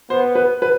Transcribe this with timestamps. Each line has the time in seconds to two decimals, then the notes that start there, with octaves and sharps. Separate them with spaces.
0.10 B3 C5
0.35 B4
0.62 B4